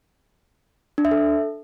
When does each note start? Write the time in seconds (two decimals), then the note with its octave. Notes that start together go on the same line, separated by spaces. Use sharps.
0.98 D4
1.05 E5
1.11 A4